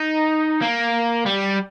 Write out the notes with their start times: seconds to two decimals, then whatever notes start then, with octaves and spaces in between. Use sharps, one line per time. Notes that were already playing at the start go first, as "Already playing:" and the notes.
Already playing: D#4
0.62 A#3
1.26 G3